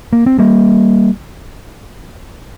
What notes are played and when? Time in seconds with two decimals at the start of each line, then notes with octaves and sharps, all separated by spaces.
0.13 A#3
0.26 C4
0.39 G3 A#3